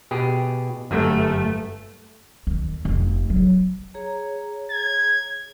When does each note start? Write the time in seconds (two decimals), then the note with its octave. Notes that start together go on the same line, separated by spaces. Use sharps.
0.11 B2 G4 G#4
0.91 G1 F#2 A3
2.47 D#2
2.85 F1
3.30 F#3
3.94 G#4 C#5 A#5
4.70 G#6